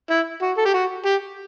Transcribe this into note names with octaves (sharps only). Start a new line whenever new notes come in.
E4
F#4
A4
G4
F#4
G4